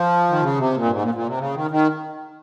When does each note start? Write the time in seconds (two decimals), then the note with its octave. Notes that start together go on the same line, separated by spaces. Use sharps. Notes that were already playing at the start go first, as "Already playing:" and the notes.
Already playing: F3
0.30 D#3
0.42 C#3
0.58 C3
0.74 A#2
0.85 G2
0.91 G#2
1.02 A#2
1.14 A#2
1.27 C3
1.38 C#3
1.55 D#3
1.71 D#3